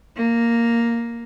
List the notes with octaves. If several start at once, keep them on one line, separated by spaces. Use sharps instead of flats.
A#3